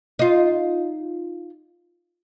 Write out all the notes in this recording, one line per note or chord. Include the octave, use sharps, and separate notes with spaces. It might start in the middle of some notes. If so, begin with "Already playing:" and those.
D#4 F4